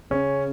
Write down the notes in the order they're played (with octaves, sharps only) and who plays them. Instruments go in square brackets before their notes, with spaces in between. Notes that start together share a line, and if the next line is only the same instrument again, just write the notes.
[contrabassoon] C#3 [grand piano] C#4